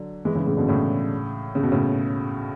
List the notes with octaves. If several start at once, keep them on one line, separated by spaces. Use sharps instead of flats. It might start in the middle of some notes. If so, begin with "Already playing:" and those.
Already playing: D3 F#3
E3 G#3
C#3 E3
A2 C#3
B2 D3
A2 C#3
C#3
B2
A2 C#3